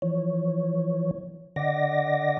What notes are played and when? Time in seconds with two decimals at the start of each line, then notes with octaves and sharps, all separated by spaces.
0.02 E3 F3 C#5
1.56 D3 D5 D#5 F#5 D6 A#6